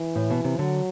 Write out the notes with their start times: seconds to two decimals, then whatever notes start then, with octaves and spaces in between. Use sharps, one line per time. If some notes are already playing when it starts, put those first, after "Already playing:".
Already playing: E3
0.16 A2
0.30 B2
0.44 C3
0.59 D3 F#3